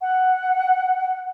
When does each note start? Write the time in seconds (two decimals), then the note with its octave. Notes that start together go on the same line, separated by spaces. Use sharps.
0.01 F#5